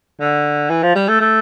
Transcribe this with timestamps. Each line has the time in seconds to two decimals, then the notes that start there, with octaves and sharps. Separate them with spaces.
0.20 D3
0.70 E3
0.83 F3
0.95 G3
1.08 A3
1.20 A3